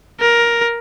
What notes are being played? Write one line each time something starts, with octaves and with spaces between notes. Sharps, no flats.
A#4